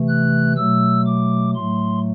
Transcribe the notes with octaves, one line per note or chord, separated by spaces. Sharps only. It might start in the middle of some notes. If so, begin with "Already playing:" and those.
Already playing: C3 E3 A3
F#6
B2 F#3 A3 E6
D6
A2 F#3 A3 C6